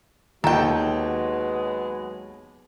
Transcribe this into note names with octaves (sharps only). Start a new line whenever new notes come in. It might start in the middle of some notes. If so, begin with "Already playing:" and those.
D#2 F#3 G#3 B3 A4 G5 A5 A#5